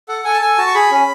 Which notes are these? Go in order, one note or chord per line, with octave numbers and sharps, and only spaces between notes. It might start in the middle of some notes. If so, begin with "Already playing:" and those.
A4 F#5
A4 G#5
A5
A4 G#5
F#4 A5
C#6
G#4 B5
C#4